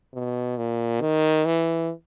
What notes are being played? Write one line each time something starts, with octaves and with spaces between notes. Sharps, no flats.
B2
A#2
D#3
E3